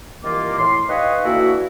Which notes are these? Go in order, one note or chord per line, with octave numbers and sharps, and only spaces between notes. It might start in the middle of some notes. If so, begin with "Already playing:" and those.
C2 D#3 E3 A#3 F4 D6
A2 C6
D#4 G4 B4 C#5 D#5 F5
D3 E3 A#3 E4 F#4